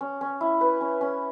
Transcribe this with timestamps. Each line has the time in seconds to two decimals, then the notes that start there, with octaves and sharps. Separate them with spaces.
0.01 C#4
0.21 C#4
0.41 E4
0.61 B4
0.81 C#4
1.01 C#4